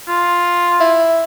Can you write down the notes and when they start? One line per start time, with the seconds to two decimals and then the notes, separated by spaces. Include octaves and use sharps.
0.08 F4
0.80 E4